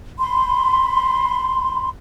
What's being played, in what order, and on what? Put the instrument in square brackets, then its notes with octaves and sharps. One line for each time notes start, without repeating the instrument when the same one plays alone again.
[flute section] B5 C6